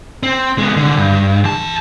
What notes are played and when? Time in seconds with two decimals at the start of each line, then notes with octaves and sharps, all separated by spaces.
0.23 C4
0.58 G#3 B3
0.76 C2 D3
0.97 G2
1.44 E2 A5